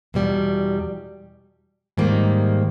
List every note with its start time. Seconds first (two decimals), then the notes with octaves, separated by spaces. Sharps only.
0.14 E2 B2 G3
1.97 G#2 D#3 G3 A#3